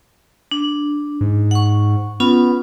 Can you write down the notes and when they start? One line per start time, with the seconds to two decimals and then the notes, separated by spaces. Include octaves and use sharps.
0.51 D4
1.21 G#2
1.51 F#5 C#6
2.20 B3 C#4 F4 B5